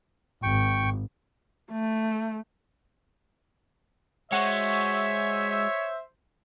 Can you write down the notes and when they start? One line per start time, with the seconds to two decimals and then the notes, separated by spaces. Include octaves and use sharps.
0.43 G#1 G5 C#6
1.72 A3
4.32 G#3 F#4 C5 C#5 E5 C#6